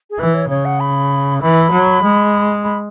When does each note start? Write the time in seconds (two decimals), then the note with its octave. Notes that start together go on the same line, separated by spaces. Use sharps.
0.10 G#4
0.19 E3 B4
0.34 C#5
0.49 C#3 C#5
0.65 F#5
0.80 B5
1.41 E3 B5
1.71 F#3
2.03 G#3
2.64 B5